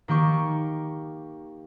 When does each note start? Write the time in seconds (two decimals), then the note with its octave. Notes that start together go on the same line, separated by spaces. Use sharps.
0.08 D#3 A#3 G4 C#6